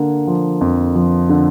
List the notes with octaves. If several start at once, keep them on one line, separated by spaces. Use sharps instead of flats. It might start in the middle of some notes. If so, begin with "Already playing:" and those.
Already playing: D3 A#3
F3
F2
F3
D3